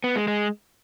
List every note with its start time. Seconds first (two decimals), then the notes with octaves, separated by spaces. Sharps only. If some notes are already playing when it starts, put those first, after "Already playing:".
0.04 B3
0.16 G#3
0.28 G#3